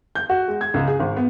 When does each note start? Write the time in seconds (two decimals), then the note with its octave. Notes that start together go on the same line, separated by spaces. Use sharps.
0.15 G6
0.29 F#4
0.48 G#3
0.61 G#6
0.74 C#2
0.87 G#4
1.00 G#1
1.17 B3